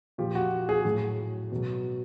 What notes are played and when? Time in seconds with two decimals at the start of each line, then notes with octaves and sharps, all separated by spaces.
0.18 A#2 F3 G4
0.35 F#4
0.69 G#4
0.85 A2 F#3
1.52 B2 F#3